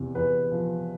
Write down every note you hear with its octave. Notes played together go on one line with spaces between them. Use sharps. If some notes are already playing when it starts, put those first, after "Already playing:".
Already playing: E2 C3
E2 B4
F3